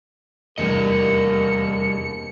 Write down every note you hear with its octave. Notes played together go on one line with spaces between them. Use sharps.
F1 E2 G2 G3 A#3 A#4 D#5 C#7